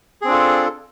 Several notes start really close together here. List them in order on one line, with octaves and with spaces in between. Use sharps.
G#4 C4 D4 F4 A4